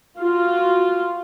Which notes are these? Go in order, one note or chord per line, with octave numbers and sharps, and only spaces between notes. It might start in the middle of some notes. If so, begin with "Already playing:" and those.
F4 F#4